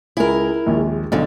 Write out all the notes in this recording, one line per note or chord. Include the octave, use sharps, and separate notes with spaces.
C#2 E4 G#4 A#4
A#1 D#2 G#3
B1 F2 G#2 D3